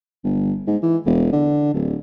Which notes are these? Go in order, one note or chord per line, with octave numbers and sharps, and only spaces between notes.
G1
G#2
E3
E1
D3
D1